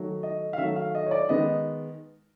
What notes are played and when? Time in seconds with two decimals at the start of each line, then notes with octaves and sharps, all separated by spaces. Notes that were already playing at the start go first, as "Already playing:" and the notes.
Already playing: D#3 F#3 A3
0.23 D#5
0.53 F5
0.58 D#3 F#3 A3 E5
0.76 F5
0.95 D#5
1.06 C#5
1.11 D5
1.29 D#3 G#3 B3 D#5